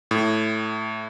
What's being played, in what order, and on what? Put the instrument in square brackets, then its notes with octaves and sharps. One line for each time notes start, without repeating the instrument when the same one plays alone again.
[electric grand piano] A2